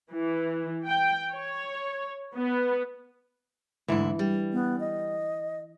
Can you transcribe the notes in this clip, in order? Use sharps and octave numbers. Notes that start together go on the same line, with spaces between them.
E3
G5
C#5
B3
D2 G#2 E3 E4
G3
B3
D#5